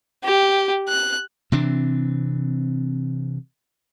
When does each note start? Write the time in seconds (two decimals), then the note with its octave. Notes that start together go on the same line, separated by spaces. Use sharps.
0.24 G4
0.89 F#6
1.52 C3 E3 C4 D4